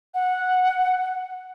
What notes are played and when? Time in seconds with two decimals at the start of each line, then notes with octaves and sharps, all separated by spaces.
0.14 F#5